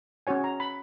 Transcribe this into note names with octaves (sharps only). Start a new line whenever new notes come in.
C#4 F#4 C#5 G#5
A#5
B5